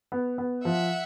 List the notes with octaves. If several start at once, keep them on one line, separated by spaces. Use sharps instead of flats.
B3
B3
F3 E5 F#5